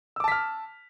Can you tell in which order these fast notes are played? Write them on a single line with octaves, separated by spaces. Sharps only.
E6 D6 A5 B6 F6